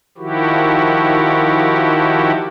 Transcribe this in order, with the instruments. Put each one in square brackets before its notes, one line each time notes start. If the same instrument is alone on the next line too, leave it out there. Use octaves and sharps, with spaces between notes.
[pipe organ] D#3 F3 E4 F#4 G4